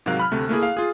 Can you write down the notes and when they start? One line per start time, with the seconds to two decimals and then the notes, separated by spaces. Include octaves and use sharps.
0.06 G#2 C3 F#3 A#4 F5 F#6
0.20 B5 F6
0.32 D2 C3 A3
0.49 A3 A#3 E4 G#4
0.63 F5
0.77 F4 G#4